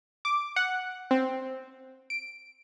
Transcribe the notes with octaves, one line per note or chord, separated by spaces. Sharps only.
D6
F#5
C4
D7